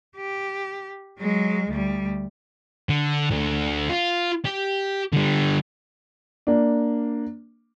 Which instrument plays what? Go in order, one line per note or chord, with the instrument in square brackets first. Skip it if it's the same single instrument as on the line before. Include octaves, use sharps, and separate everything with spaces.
[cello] G4
F#3 G#3
D2 G3
[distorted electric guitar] D3
D2 D3
F4
G4
D3 G3
[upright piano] A#3 D4